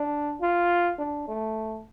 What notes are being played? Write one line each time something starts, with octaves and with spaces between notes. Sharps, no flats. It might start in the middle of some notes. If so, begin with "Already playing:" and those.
Already playing: D4
F4
D4
A3